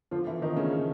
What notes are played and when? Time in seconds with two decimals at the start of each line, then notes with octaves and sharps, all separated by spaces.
0.11 D3 F3 F4
0.27 D3 E3 E4
0.42 D#3 F3 D#4
0.56 C#3 A3 C#4
0.72 A3